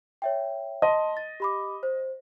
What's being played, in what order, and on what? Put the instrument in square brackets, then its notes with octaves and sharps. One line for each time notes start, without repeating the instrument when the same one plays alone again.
[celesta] C#5 E5 G5
[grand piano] D#5 [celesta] A5 C6
[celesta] A6
G4 B5 D6
C5